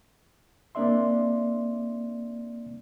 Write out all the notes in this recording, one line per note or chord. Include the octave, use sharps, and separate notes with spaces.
A#3 C4 D4 D5 E5 C6